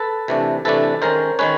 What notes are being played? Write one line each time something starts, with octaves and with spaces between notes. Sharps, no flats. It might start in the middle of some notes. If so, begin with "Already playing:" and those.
Already playing: A4 B4
C3 E3 A3 D4
C3 E3 A3 D4 A4 B4
D#3 G#3 C#4 A#4 C5
D#3 G#3 C#4 B4 C#5